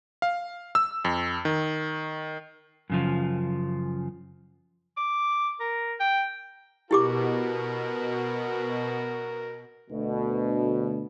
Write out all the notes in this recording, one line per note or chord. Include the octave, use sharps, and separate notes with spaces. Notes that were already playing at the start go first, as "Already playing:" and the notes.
F5
E6
F2
D#3
F#2 C#3 F3
D6
A#4
G5
B2 E4 F#4 G4 A#4 D6
D2 B2